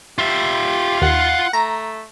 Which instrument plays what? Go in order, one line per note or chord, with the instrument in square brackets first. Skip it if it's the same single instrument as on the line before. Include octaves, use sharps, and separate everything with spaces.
[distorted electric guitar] F4 E5 [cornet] G4
[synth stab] D#2 [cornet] F#5
[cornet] A3 [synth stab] A#5